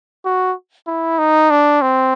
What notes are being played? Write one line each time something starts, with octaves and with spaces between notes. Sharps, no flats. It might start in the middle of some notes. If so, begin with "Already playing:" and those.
F#4
E4
D#4
D4
C4